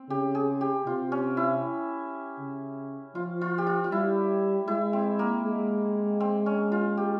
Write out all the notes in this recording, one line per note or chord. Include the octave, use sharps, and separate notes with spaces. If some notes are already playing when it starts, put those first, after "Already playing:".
Already playing: C4
C#3 G4
G#4
G4
C3 F4
C#4
E4
C#3
F3 F4
F4
G4
F4
F4
G3 E4
G#3 E4
C4
A#3
G#3
C4
C#4
F4
G4